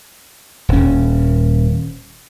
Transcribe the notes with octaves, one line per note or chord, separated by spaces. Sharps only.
D#1 C#4